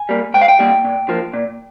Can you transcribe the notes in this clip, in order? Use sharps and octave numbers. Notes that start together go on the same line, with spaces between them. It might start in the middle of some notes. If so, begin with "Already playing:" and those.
Already playing: G#5
G3 A#3
G#2 G5
F5
G5
G3 A#3
A#2
F3 A#3
A#2